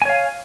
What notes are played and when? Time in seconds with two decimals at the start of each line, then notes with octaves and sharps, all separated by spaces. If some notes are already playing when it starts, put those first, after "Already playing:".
0.02 G#5
0.05 C#5
0.09 F5